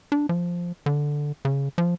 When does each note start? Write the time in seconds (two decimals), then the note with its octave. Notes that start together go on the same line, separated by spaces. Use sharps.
0.12 D4
0.29 F3
0.86 D3
1.45 C#3
1.78 F3